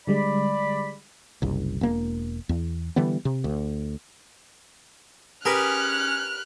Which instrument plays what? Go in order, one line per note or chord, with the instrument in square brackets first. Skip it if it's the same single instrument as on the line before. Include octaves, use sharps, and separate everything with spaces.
[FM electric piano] D3 G3 G#3 [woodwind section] D5 B5
[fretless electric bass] F#1 C2
E1 A#3
E2
D3 E3 G3 B3
C3
D2
[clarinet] C#4 [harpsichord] G4 A#4 B4 [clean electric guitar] G#4 [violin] F6 F#6